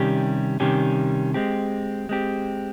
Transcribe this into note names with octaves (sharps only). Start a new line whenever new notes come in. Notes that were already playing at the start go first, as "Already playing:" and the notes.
Already playing: C3 D#3 G3 C#4 G4
C3 D#3 G3 C#4 G4
G#3 C4 G4
G#3 C4 G4